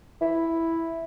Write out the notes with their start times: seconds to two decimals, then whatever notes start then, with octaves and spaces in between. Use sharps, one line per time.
0.22 E4